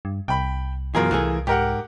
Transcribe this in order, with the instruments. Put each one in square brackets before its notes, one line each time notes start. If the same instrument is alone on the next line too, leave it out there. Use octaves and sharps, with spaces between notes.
[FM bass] G2
[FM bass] C2 [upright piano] G5 B5
[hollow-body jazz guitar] F#2 B2 G#4 [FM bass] E3 [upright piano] F4 A#4
[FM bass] C2 [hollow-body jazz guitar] E3 A3 G#4
[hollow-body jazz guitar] G#2 [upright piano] G4 A#4 F#5